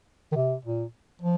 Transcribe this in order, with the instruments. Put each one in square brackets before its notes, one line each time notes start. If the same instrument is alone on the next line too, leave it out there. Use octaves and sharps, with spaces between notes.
[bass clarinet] D#3
C3
A#2
F3